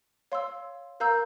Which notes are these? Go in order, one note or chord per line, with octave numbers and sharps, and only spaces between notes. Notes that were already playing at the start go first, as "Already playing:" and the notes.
C#5 F5 C6 E6
A#4 F5 A#5 E6 G6